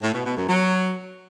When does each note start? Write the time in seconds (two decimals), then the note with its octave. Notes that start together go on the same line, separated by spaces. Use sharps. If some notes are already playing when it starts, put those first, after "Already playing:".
0.02 A2
0.13 B2
0.25 B2
0.36 F#2
0.48 F#3